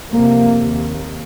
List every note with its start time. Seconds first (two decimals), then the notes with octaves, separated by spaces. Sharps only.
0.13 F2 C3 A#3
0.64 D#2